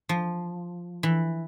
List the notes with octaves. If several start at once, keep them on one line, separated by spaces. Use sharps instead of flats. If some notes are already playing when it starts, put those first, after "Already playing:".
F3
E3